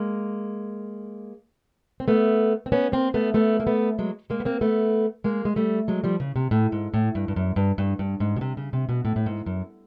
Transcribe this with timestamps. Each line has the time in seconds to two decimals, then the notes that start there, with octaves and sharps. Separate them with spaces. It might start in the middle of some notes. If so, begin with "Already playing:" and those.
Already playing: G#3 A#3
2.00 C4
2.08 A3 B3
2.66 C4
2.72 B3 C#4
2.92 A#3 C4
3.14 A3 B3
3.34 A3 B3
3.60 A#3
3.67 A3 B3
3.99 F#3 G#3
4.30 G#3 A#3
4.40 B3
4.45 A#3 C4
4.61 A3 B3
5.24 G#3 A#3
5.45 G#3
5.56 G3 A3
5.88 F#3 G#3
6.04 F3 G3
6.20 C#3
6.36 C3
6.51 A2
6.72 G#2
6.94 A2
7.15 G2
7.28 G2
7.36 F#2
7.56 G2
7.78 G2
7.99 G2
8.20 G#2
8.36 B2
8.41 C3
8.57 C#3
8.73 C3
8.89 B2
9.05 A2
9.16 A2
9.26 G#2
9.46 F#2